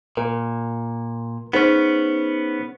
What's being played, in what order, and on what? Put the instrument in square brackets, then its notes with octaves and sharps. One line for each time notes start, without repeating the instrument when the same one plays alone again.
[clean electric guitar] A#2 [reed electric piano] A#4
[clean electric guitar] B3 C#4 [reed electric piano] D#4 G#4 C5